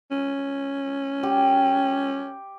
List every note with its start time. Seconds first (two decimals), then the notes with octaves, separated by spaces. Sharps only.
0.11 C#4
1.23 G4